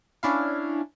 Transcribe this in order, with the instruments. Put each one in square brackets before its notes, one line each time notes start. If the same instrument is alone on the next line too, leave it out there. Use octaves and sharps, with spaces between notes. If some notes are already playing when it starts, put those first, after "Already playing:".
[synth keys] C#4 D4 E4 F5